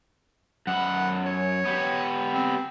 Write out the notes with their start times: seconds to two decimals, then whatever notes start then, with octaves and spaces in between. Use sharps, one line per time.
0.67 F#2 F#5 B5
1.25 C#5
1.65 B3 G4
2.34 C4